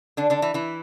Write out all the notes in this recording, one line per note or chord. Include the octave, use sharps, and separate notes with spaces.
D3 D4
D3 D4
E3 E4
E3 E4